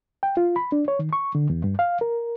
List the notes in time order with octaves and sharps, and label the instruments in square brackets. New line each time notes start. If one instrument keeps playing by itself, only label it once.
[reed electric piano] G5
F4
B5
D4
C#5
D#3
C#6
D3
E2
G2
F5
A#4